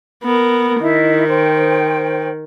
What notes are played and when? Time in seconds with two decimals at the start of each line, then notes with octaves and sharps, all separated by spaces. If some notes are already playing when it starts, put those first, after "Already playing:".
0.23 B3 A#4
0.82 D#3 E4 D#5
1.28 C5 G5